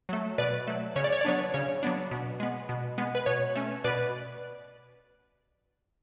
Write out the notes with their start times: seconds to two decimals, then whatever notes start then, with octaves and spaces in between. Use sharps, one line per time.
0.09 F#3 A3
0.38 B2 B4 D5
0.67 F#3 A3
0.96 C#3 C#5
1.04 D5
1.12 C#5
1.21 D5
1.25 F#3 B3 D4 C#5
1.54 C#3 C#5
1.83 F#3 B3 D4
2.11 B2
2.40 G#3 B3
2.69 B2
2.98 G#3 B3
3.15 B4
3.26 B2 C#5
3.55 A3 C#4
3.84 B2 B4 D5